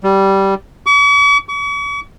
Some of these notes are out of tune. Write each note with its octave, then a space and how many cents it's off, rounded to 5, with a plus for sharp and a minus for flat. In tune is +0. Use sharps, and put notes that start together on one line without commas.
G3 -10
C#6 +45
C#6 +40